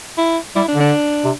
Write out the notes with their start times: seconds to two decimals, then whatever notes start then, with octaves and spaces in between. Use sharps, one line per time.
0.18 E4
0.56 G3 E4
0.68 D4
0.75 D3
0.80 D4
1.24 C3